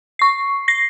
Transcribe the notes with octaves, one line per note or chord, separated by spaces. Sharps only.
C#6 C7
A#6 C7